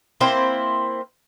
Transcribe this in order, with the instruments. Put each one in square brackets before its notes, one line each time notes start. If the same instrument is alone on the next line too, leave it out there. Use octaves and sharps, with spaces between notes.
[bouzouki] A#3 C4 E4 C5